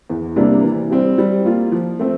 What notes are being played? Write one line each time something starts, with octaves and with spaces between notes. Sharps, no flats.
E2
C3 G3 A#3 D4
E3
G3 C4
G3
A#3 F4
F3
A3 C4